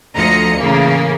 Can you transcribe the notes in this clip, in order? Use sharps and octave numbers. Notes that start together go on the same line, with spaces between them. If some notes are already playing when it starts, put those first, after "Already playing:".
D2 F3 D#5 A#5 C#7
A2 C#3 E3 A#3